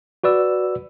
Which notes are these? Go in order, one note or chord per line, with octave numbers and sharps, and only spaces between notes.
F#4 B4 D5 E6